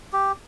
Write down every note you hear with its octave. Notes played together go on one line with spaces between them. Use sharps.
G4